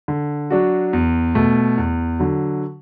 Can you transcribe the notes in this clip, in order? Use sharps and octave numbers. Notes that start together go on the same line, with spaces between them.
D3
F#3 D4 F#4
E2
B2 A3
E2
D3 F#3